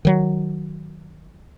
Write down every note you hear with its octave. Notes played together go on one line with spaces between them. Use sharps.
D#3 F#3